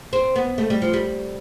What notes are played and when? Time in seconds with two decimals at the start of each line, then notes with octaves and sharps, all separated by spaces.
0.13 C4
0.36 B3
0.58 A3
0.70 G3
0.82 F3
0.93 G3